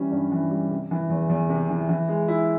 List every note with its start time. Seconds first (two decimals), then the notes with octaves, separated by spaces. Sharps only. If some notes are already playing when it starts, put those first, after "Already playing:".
Already playing: E3 G3 C#4
0.12 G2
0.32 E3
0.51 G3
0.71 C3
0.91 E3
1.10 E2
1.30 E2
1.49 C3
1.69 E3
1.89 E3
2.08 G#3
2.28 E4